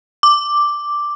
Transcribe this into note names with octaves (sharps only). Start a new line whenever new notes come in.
D6